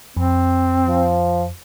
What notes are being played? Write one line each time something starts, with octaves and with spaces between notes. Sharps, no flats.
F2 C4
F3